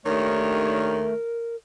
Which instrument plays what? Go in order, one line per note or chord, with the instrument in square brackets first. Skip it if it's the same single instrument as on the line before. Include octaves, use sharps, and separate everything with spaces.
[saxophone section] D#2 D4 C#5 [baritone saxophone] D#3 [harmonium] A3 [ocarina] A#4